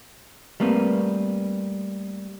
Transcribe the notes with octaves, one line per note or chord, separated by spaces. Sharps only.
G3 A3 A#3 C4 B4